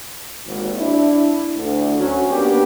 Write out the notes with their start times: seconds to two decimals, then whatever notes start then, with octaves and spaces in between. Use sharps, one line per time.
0.46 G#1 D#2
0.78 D4 E4
1.55 D2
1.99 F#3 C#4
2.31 A#3 B3 C#4 D4 G4